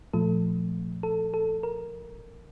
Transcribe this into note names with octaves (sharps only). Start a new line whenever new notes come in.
A#2 F3 A3 A4
A4
A4
A#4